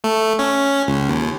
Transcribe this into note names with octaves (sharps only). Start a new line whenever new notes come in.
A3
C#4
C#2
D#2